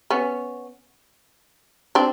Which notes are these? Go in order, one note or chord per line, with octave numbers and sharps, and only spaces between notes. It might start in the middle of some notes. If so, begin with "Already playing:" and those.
B3 C#4
C4 D4